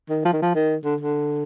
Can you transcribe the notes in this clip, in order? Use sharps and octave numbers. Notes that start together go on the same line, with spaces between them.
D#3
F3
D#3
F3
D#3
D3
D3